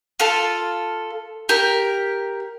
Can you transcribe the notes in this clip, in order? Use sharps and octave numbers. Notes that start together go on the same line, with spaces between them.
F4 A4
G4 A#4